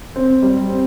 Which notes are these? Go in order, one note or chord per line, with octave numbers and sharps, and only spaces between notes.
C4
G3
C4